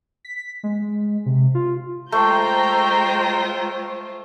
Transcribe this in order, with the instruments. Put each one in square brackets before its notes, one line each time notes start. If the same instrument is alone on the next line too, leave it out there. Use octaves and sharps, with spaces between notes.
[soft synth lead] B6
G#3
C3
F4
[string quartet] G#3 F4 C5 [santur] A3 [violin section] G5 A#5 G6